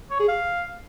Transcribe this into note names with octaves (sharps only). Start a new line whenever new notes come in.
C#5
G#4
F5